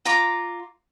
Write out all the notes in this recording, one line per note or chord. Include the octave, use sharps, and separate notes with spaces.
F4 A#5 D6